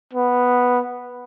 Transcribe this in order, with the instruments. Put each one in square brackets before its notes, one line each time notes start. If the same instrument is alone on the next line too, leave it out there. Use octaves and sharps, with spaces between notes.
[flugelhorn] B3